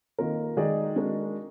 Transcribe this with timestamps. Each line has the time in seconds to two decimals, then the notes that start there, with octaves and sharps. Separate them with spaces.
0.19 D#3 A#3 F4 A#4
0.57 D#3 G#3 D#4 G#4 D5
0.96 G#3 D4 F#4 A#4